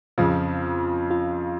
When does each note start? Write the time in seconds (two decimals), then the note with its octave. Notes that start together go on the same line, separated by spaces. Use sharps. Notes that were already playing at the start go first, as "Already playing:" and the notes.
0.18 F2 C#3 F3 F4
1.10 F4